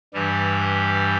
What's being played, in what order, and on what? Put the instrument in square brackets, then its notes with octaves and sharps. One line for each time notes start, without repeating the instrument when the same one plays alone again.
[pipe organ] G2 E3 G3 G4